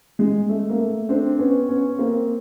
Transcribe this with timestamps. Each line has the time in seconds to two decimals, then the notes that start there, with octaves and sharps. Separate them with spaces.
0.19 G#3
0.49 A3
0.70 A#3
0.79 A3
1.09 C4 D4
1.39 B3 C#4
1.69 B3 C#4
1.99 A#3 C4